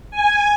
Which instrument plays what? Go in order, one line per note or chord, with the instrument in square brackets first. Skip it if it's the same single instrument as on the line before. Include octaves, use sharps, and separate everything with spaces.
[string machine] G#5